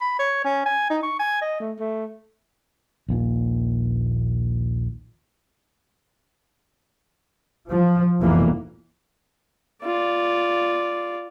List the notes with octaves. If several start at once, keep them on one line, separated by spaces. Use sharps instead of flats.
B5
C#5
C#4
G#5
D#4
C#6
G#5
D#5
A3
A3
A#1 D#2 A#2
F3
F1 C2 B2 E3 A#3
F4 D5